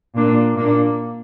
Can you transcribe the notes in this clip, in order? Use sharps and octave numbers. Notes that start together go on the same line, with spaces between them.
A#2 A#3 D4
A#2 A#3 D4